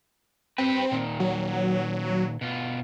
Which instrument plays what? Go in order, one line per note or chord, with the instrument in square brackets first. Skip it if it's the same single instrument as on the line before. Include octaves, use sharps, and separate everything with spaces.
[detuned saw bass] C4 [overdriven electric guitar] G4 B4
[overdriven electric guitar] A#2 D#3
[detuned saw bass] F#3
[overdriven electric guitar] B2 F4